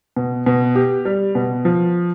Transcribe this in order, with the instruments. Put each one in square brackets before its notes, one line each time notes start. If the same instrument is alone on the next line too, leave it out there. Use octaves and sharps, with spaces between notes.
[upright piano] B2
B2
G4
G3
B2
F3